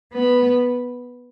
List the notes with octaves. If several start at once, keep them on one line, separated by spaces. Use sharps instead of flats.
B3 B4